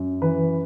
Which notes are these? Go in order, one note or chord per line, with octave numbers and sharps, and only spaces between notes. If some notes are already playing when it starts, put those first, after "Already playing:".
Already playing: F#2
E3 B4